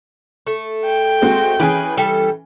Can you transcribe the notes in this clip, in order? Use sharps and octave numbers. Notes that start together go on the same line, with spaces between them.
A3
G5
G#3 C4 F#4
E3 C#4 G#4 B4 D7
G3 A4